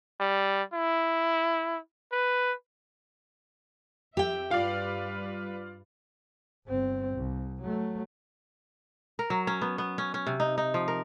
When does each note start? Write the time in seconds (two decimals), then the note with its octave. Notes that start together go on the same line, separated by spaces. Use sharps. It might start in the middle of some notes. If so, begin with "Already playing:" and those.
0.20 G3
0.73 E4
2.12 B4
4.17 F2 G4 E5 G5
4.51 G2 G3 F4 B4 D5 F5
6.67 G1 C4
7.15 C2
7.62 F#3 A3
9.19 A#4
9.30 F#3
9.47 C#4
9.62 B3
9.78 B3
9.98 C#4
10.14 C#4
10.27 C3
10.40 D#4
10.58 D#4
10.74 F3
10.88 A#4